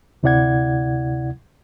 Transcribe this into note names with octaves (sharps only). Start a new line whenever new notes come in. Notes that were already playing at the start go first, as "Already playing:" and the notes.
D2 C3 E4 D5 F#5 G#6